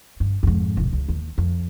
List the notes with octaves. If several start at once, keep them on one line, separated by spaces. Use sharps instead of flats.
G2
F2 G#2
D#1 C2
C#2
D#2
F2